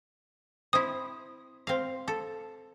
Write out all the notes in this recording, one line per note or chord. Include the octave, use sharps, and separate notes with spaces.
C4 E4 D#6
C4 F5
A4